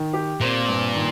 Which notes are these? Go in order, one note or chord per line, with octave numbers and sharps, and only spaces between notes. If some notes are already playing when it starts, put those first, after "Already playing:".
Already playing: D#3
G4
A#2 C4
G2
D#3